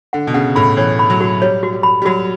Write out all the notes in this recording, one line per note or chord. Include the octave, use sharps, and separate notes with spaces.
D3 F#5
B2
C#3 F#5
A2 B5
E3 C#5
B5
F#3
F#4
G3 C#5
F#4
G3
B5
G3
F#3 F#4